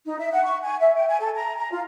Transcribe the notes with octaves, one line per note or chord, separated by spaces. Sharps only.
D#4
E5
F#5
C#6
G#5
E5
G5
G#5
A4
A#5
A#5
F4